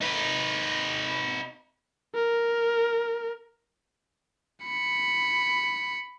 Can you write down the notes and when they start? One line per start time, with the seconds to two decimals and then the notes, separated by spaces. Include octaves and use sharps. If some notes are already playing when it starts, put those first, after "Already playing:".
0.01 D#4 B4
2.15 A#4
4.64 B5 C#7